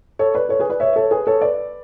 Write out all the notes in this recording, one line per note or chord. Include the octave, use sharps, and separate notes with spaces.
A4 C#5
B4 D5
A4 C#5
G#4 B4
B4 D5
C#5 E5
A4 C#5
G#4 B4
A4 C#5
B4 D5